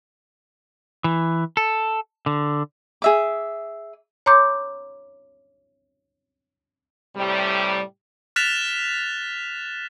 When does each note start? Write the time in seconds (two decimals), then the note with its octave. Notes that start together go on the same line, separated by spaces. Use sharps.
1.04 E3
1.57 A4
2.26 D3
3.02 G#4 E5 D6
4.26 C#5 A#5 C6 D6 G6
7.16 A2 C3 G3
8.36 F6 F#6 A6 B6 E7 F7